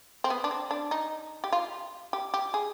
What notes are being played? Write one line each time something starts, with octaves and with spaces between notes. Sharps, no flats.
C4
B3
D4
C4
D4
D#4
G4
F4
G4
G4
G#4